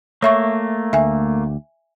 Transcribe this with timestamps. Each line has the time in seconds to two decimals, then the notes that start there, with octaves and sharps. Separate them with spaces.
0.22 A3 A#3 C#5 E5 C#6
0.93 D2 E5 G#5